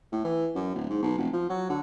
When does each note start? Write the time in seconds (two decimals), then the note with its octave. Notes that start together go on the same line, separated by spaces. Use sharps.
0.12 A2
0.25 E3
0.55 F#2
0.75 D1
0.90 G#2
1.02 B1
1.18 F1
1.33 F3
1.49 F#3
1.70 D3